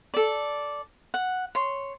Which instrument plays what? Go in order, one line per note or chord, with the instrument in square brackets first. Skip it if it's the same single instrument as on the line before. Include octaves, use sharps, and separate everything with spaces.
[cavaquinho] A4 D5
F#5
C#5 C6